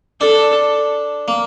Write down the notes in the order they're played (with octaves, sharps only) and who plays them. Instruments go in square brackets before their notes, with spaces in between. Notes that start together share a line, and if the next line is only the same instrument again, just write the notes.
[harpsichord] D4 [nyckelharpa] A4
[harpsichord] A#3